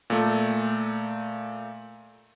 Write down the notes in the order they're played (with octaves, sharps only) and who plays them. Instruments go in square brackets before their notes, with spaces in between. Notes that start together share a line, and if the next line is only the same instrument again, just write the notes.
[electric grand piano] A#2 A3